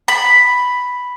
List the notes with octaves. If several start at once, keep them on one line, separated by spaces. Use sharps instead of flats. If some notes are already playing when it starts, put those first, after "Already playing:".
B5